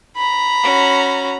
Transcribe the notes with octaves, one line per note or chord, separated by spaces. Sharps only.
A#5 B5
C#4 F#4